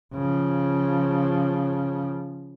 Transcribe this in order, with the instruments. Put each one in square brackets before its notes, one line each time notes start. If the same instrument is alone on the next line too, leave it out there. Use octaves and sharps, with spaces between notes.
[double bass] C#3 F3